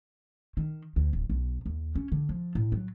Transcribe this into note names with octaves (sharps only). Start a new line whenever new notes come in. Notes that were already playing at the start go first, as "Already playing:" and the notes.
D#3
D2
D1
B1
D#2
C#4
D3
F3
A2
F#3